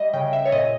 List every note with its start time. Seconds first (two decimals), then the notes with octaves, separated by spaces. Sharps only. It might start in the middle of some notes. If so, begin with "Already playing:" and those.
Already playing: G3 D#5 E5
0.13 C#3 G5
0.33 E5
0.45 C#5
0.52 A#2 D#5